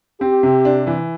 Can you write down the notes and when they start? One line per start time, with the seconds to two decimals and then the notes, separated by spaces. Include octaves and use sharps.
0.21 C4 G4
0.43 C3
0.65 D4
0.87 E3